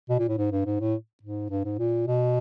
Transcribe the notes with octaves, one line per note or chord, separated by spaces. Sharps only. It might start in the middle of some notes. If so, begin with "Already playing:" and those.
B2
A#2
A2
G#2
G2
G#2
A2
G#2
G2
G#2
A#2
B2